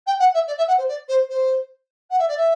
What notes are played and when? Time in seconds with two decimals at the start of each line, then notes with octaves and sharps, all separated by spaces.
0.06 G5
0.19 F#5
0.34 E5
0.47 D5
0.57 E5
0.68 F#5
0.78 C5
0.88 D5
1.08 C5
1.29 C5
2.10 F#5
2.19 E5
2.28 D5
2.37 E5